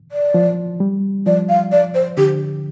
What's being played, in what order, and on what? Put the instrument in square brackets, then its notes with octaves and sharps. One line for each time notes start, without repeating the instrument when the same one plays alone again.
[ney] D5
[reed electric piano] F3
G3
[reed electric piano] F3 [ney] D5
[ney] F5
D5
C5
[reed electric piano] D3 [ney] G4